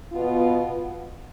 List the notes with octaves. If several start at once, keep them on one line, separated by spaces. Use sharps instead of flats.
B2 B3 F4